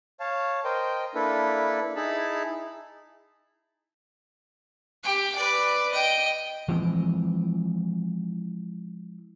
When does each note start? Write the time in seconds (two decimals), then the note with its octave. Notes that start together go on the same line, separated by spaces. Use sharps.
0.20 C#5 F5 A5
0.65 A#4 C5 D#5 G5
1.15 A#3 D4 E4 A4 B4
1.96 D#4 E4 G#4 A5 B5
5.04 G4 G5
5.35 B4 D5
5.92 D#5 G5
6.68 E3 F3 G#3 C4